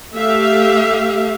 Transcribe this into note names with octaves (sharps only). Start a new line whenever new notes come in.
A3 G4 E5 F5